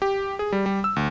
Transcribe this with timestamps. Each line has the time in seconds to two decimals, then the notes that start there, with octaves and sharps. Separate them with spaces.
0.02 G4
0.39 G#4
0.52 G3
0.66 G3
0.84 E6
0.96 D2